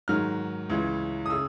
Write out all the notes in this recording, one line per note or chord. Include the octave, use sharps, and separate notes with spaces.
G#2 D#3 F#3 F6
C#2 C#3 E3
D#6
C#3 E6